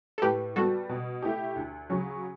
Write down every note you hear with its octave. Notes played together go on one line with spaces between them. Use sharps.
A4
A2 G4 B4
G3 B3 F#4 A4
B2
A3 E4 G4
D2
C#3 F#3 C#4